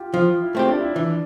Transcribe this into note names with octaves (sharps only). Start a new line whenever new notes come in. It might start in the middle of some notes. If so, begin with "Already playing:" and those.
Already playing: F4 G4
F3 F4
E4
A3 C4 G4
D4
E4
E3 D4